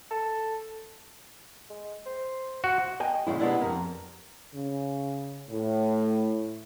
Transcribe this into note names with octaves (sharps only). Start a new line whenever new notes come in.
A4
G#3
C5
F#4 C5
D#5 G5 G#5
A#2 C#3 F3 G#3 E4
C3 G#3 A3 B3 D4 E4
F2 A#2 A#4
C#3
A2